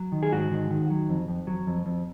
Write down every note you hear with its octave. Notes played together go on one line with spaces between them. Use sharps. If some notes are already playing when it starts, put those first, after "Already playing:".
Already playing: F#3
D#3
G#4
G#2 F#4
D#3
D#3
F#3
F2
F2
F#3
F2
F2